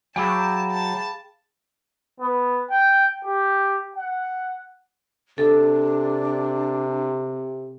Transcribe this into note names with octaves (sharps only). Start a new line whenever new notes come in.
F#3 G#4 F5 G5 A5 B5 D6 E6
A5
B3
G5
G4
F#5
C3 D4 A4